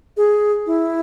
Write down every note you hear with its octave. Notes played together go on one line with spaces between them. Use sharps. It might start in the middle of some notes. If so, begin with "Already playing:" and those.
G#4
E4